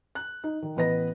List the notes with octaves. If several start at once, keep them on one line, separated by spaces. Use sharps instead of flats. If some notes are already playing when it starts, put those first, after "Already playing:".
F#6
D#4
D#3
A1 B3 B4 D#5 A#6